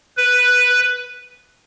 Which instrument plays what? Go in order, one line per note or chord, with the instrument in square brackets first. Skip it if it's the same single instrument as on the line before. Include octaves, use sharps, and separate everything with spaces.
[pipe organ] B4